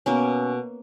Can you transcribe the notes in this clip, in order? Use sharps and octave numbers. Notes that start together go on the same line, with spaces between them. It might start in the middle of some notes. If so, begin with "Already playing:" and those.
B2 A#3 C#4